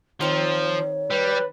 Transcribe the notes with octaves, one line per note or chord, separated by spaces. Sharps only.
D#3 F3 C4 C#5 C#6
G3 B4